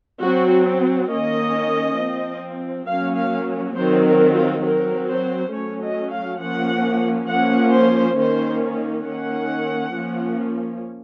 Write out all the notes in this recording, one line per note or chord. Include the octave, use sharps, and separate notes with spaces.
F#3 C4 F#4
D#3 A#3 C#4 D#5
F3 C4
F#3 A#3 C#4 F5
F5
D#3 F#3 C4 C5
A#4
F4
F#3 C4 A#4
C5
F#3 A3 C#4 C#5
D#5
F5
F3 A#3 C#4 F#5
F3 A#3 C#4 F#5
C5
D#3 A#3 C#4 C5
D#3 A#3 C#4 F#5
F3 A#3 C#4